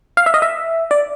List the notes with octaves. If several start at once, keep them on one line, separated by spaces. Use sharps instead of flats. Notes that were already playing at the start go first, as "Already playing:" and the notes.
F5
E5
D#5
E5
D5